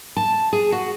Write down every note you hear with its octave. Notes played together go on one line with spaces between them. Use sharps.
A5
G#4
F#4